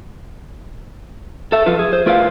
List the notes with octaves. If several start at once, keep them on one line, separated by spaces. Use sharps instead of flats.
A4 E5
F3 F4 A4 B4
G#4
C5
A3 F4 A#4 B4 E5 F5